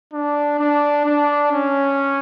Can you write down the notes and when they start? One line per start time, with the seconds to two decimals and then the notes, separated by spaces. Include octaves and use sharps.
0.13 D4
0.60 D4
1.06 D4
1.52 C#4